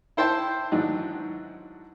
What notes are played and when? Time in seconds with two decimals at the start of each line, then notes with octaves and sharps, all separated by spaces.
0.17 E4 C5 G5 A5 C6
0.72 G#2 D#3 E3 F#3 D4 D#4